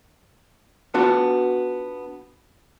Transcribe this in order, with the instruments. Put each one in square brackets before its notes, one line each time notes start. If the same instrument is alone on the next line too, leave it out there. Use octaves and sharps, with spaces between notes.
[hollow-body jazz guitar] B3 D4 F4 F#4